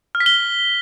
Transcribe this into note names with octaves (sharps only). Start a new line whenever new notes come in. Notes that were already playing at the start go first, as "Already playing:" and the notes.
F6
B6
G7